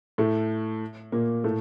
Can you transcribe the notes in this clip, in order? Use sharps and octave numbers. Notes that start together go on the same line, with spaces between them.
A2 A3
A#2 A#3
A2 A3